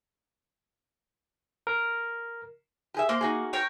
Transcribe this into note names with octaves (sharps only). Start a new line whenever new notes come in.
A#4
G4 G#4 E5
A#3 C5
D#4 F#4 G#4
A#4 C#5 G5